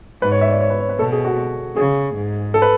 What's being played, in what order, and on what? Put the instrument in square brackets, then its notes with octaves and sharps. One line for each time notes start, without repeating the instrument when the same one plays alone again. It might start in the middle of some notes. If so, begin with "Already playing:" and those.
[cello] G#2 [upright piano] B4
[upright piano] C#5
E5
D5
C#5
B4
C#5
B4
[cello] B2 [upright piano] A4
[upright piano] G#4
F#4
[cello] C#3 [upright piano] G#4
[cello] G#2
[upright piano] A4
B4